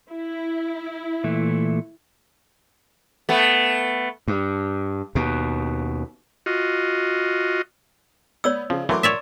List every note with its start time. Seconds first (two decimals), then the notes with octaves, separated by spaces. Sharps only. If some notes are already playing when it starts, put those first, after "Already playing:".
0.11 E4
1.24 A#2 E3 A3
3.29 A3 B3
4.28 G2
5.15 D#2 B2
6.46 F4 F#4 D#5
8.44 B3 C#5 D5 E6
8.70 C#3 F3
8.89 E3 F#3 A3 A#4 C6 D6
9.03 C#5 D5 E5